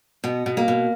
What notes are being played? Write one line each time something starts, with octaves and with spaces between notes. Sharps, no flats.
B2 B3
B2
A#3
B2